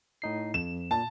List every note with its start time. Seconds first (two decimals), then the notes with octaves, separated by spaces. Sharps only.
0.22 A2 D#4 C7
0.54 F2 E7
0.91 A#2 A5